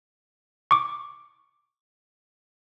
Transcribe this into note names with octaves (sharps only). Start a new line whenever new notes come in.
C#6 D6